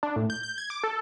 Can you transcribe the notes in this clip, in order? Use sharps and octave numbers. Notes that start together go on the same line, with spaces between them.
D4
A2
G6
G6
G#6
D6
A4